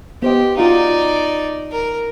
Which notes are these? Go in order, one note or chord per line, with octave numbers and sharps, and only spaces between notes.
B3 G4 C5 D#5
D#4 F4 F#4 D5 F5
A#4